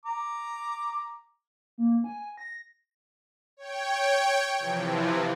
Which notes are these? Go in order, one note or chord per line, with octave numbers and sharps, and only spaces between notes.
A#5 D6
A#3
G#5
A#6
C#5 G5
C3 E3 F3